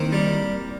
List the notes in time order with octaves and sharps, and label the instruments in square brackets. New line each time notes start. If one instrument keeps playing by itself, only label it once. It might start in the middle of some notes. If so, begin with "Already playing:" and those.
Already playing: [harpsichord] D#3 [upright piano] A#3 C4
[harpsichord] G3